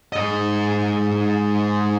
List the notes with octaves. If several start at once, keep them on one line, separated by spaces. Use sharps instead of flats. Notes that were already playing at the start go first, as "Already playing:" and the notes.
G#2 D#5